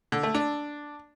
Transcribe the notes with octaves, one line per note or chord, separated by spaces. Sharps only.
D3
A3
D4